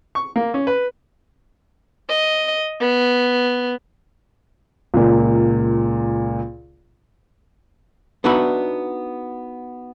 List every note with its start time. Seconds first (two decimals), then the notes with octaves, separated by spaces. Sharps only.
0.15 C#6
0.36 A#3
0.54 C#4
0.67 B4
2.09 D#5
2.80 B3
4.94 C#2 A#2
8.24 B3 D4 D#4 F#4 E5 B5